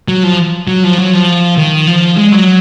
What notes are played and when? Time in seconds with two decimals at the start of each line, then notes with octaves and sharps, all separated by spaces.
0.08 F#3
0.24 F3
0.68 F#3
0.84 F3
0.98 F#3
1.13 F3
1.57 D#3
1.87 F3
2.17 G#3
2.32 F#3